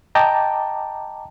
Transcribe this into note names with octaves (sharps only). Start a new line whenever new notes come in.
D#5 G5 A5 A#5 D6